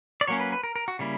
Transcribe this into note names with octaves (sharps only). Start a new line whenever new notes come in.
D5
F#3 A#3 C#4 C#5
B4
B4
A#4
A#4
F#4
C#3 G3 A#3 E4